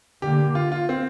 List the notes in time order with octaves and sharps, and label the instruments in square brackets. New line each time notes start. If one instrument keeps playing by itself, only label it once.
[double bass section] D3 A#3 [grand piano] G4
[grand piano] F4
F4
C4